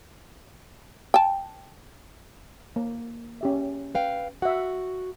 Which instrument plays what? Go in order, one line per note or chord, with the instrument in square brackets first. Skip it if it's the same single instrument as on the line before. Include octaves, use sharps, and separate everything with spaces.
[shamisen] G5 A5
[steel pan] A#3
C#4 G4 E5
[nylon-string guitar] B4 F5 G5
[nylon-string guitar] F#4 [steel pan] E5 F#5